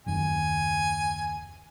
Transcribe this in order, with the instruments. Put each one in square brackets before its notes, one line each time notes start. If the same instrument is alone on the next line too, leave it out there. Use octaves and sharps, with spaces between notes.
[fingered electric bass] F#1 D#2 [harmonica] G#5